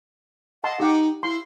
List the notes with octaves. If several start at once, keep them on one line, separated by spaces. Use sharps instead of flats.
D#5 F#5 A5 C6
D#4 G4 F#5
E4 C6